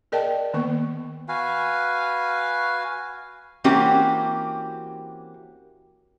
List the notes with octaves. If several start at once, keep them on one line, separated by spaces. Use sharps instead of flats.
G#4 A#4 D5 D#5 G5 A5
D#3 A#3 B3 C#6
F#4 B4 F5 G#5
E3 A#3 C4 C#4 F#4 G4